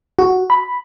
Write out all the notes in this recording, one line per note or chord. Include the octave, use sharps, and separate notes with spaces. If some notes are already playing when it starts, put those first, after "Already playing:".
F#4
B5